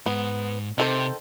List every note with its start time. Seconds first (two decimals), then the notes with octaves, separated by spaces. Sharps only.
0.06 G#2 B3
0.78 C3 D#3 A4 C5